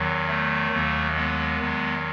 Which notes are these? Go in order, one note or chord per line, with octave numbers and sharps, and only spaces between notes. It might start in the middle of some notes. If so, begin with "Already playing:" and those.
Already playing: E2 D#3 F#3
A3
D#2 D#3 F#3
G#3 B3
E2 D#3 F#3